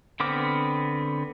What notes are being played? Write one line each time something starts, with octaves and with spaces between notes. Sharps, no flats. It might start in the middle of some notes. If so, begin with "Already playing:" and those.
D3 B3 C4 D6 F6